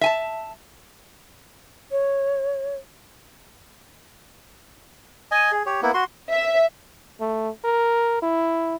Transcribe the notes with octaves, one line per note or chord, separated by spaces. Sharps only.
E5 G#5 A5
C#5
D#5 G#5
G#4
G4 C#5
A#3 B3 E4
F#4 C6
E5
A3
A#4
E4